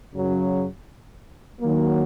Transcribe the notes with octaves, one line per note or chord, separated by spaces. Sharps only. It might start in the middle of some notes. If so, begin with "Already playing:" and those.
F#2 C#3 F#3
D#3 F#3 A#3